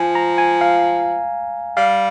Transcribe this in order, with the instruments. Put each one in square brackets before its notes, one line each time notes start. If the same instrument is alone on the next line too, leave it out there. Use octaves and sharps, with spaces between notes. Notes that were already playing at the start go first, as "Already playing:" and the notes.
Already playing: [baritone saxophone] F3 [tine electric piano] G#5
[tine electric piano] A#5
G#5
F5
[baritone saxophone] G3 [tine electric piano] F5